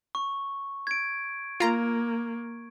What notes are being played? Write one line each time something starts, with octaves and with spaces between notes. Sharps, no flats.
C#6
G#6 D7
A#3 F4 A#5